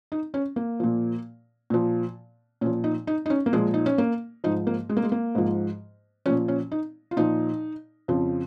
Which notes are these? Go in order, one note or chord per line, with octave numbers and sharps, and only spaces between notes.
D#4
C#4
A#3
A#2 F3
A#2 F3
A#2 F3 C#4
D#4
D#4
D#4
C#4
A#3
A#2 F3 G#3
D#4
C#4
A#3
G#2 F3 D#4
A#3
G#3
A#3
G#3
A#3
G#2 F3
A#2 F3 C#4
C#4
D#4
F4
A#2 F3 D#4
F2 C#3 F3